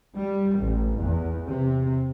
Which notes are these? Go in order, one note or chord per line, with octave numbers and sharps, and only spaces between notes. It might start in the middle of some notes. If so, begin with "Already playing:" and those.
G3
A1
E2
C3